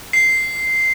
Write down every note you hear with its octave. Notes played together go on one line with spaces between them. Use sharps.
C7